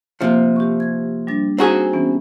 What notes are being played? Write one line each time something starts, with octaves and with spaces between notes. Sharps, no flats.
C3 F3 A#3
G4 C#6
G#6
G3 D4 A6
C4 D#4 F#4 G#4 G#5 A#5
E3 B3 C#4